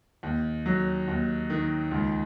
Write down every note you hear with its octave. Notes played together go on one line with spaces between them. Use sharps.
D#2
F#3
D#2
D#3
C#2